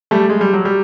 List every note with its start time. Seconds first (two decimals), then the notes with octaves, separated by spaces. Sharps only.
0.11 G3 A3
0.29 G#3
0.41 G3
0.53 F#3
0.65 G3